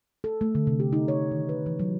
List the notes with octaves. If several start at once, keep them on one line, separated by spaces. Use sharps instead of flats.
A4
A3
D3
C3
G4
D#4
C#5
D#3
B4
E3
F#3